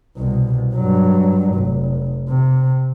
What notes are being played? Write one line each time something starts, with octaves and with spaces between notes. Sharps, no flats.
C2 B2
G2 F#3
F1
C3